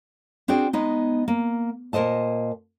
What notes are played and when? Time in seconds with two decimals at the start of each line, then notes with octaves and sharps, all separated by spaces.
0.48 C4 D4 F#4 G#4 G5
0.73 G#3 B3 D#4
1.28 A#3
1.93 A#2 A#4 C5 D#5 A5